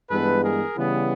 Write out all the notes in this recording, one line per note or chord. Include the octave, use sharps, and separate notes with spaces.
G2 E3 G#3 B3 A4 B4
G#4 A#4
C#3 E3 G3 B3